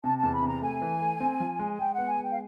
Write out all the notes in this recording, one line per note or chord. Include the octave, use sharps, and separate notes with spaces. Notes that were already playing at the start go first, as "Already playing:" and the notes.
C3 A5
A5
E2
B5
C3 A#5
A3 G#5
E3
A3
C4
F3
G#3
G#3 G5
B3 F#5
G#5
G#3 G5
F5